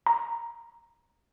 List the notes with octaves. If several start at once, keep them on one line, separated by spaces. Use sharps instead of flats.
A#5